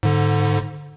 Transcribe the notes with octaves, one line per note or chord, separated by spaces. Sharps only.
G#2 D3